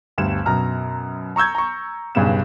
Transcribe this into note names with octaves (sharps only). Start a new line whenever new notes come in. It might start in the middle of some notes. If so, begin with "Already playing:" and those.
G1 D2 G3 E7
F#2 B2 A#5 F6
A#5 C#6 E6 G6 G#6
A#5 C#6
E1 B1 G2 C#3 B3 E7